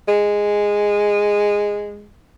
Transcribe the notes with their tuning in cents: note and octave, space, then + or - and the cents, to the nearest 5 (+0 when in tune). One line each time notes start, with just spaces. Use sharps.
G#3 -10